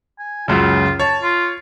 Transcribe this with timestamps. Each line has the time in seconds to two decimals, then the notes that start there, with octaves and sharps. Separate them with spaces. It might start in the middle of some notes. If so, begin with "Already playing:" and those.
0.19 G#5
0.48 C#2 F#2 C#3 F4
1.00 C#5 A5
1.22 F4